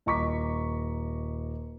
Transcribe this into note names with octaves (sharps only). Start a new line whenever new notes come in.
D#1 D#5 A#5 C#6 D6 B6